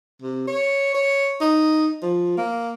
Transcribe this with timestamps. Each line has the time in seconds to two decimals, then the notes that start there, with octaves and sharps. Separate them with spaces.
0.22 C3
0.48 C#5
0.94 C#5
1.41 D#4
2.02 F3
2.38 A#3